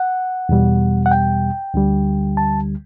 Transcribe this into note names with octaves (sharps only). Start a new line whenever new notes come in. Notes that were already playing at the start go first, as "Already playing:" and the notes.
Already playing: F#5
E2 B2 G3
F#5
G5
D2 D3 G3
A5